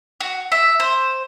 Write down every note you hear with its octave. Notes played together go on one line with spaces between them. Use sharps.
F#4
E5
C5